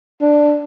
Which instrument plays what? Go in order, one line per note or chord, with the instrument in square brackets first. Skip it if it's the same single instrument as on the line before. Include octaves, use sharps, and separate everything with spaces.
[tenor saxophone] D4